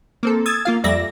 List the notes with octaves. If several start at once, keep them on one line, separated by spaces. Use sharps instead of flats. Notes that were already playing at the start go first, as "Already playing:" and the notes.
A#3 C4 A4
D#6 E6 G#6 A6
A#3 F4 F5
F2 G3 D5 E5 A#6